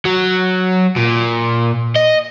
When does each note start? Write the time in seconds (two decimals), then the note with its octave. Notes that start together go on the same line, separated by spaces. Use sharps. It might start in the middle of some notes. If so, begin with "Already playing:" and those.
0.05 F#3
0.96 A#2
1.96 D#5